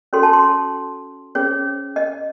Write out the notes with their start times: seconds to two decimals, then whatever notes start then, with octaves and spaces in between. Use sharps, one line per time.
0.13 C#4 F#4 A4 C#5 C6
0.23 A5
0.33 C6
1.35 C#4 G#4 C5 C#5
1.96 D#5